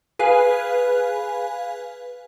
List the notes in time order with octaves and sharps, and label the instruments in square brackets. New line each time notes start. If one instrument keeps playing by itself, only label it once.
[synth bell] G#4 B4 F5 G#5 F#6